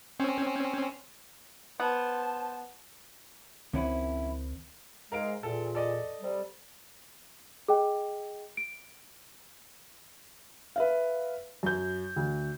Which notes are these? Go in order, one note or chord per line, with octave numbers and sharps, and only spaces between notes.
C4 C#4
B3 C5 A5
C#2 F#2 D#3 C4 C#4 E4
G#2 G#3 A#4 F5 D7
E2 A#2 A4
A4 D5 D#5
C3 G3
G#4 D#5 G5
D7
B4 E5 F5
F#2 G6
D2